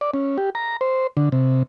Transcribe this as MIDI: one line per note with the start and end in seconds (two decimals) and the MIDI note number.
0.01 0.11 74
0.14 0.37 61
0.38 0.50 67
0.55 0.77 82
0.81 1.07 72
1.17 1.29 50
1.32 1.63 48